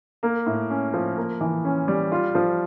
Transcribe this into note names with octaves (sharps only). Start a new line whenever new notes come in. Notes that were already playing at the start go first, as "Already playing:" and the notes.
A#3
A2
C#4
F3
A#3
E3
C#4
G3
F4
F3